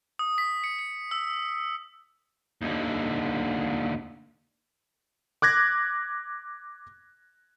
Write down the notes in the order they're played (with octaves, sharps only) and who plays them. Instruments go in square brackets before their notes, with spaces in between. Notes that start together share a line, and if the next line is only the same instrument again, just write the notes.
[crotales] D#6
B6
C#7
C#7
E6
[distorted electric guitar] D#2 D3
[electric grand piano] D6 F#6 G#6 A#6